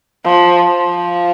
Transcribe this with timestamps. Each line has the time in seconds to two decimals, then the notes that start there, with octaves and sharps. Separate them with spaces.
0.25 F3
0.70 F3